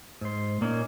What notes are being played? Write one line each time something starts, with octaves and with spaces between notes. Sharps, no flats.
G#2 C5
A#2 A#3 C#4 D#4